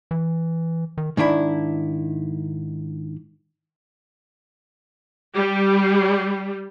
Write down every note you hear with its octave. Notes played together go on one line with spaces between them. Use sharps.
E3
D#3
G#2 D#3 D4 E4
G3